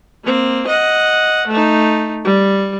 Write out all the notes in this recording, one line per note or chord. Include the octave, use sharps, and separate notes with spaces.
A#3 C4
D#5 F#5
A3 D#4
G3